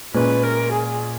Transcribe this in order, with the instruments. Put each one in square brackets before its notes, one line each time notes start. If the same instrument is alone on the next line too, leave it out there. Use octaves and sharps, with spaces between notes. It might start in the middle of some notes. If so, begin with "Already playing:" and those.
[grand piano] A#2 G#3 C#4 [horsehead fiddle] B4
[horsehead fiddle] A#4
G#4